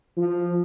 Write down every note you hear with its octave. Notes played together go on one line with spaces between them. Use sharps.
F3